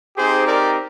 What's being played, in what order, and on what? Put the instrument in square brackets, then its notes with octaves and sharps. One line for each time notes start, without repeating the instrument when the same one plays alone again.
[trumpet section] C4 D#4 G4 G#4 C5
A#4 D5